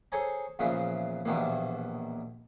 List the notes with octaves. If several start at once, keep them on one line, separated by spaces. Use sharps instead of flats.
G#4 A4 C5 C#5 G#5 A#5
E2 A#2 C#3 E3 F3
A#1 D#2 B2 D#3 E3 A#3